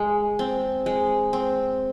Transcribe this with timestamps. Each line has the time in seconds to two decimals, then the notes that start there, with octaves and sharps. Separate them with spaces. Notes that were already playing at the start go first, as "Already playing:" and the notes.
Already playing: G#3
0.39 C4
0.86 G#3
1.33 C4